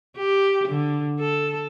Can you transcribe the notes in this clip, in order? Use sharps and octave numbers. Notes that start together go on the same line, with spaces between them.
G4
D3
A4